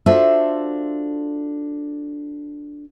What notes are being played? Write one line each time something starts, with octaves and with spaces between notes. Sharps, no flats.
D4 F4 F#4 A4 C5 E5